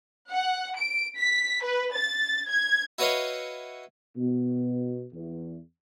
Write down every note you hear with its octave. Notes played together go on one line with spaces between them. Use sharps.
F#5
D7
B6
B4
A6
G#6
E4 F#4 B4 C#5 D#5 F5
B2
E2